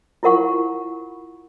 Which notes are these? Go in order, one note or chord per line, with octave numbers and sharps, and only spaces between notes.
E4 F4 A#4 F#5 C#6